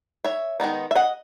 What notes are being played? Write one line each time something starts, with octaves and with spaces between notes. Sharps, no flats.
C#5 E5
D#3 G#3 B3 D#4
E5
D#5 F#5